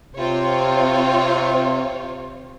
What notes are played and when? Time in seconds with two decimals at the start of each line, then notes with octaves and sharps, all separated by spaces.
0.16 C3 C4 F4 C#5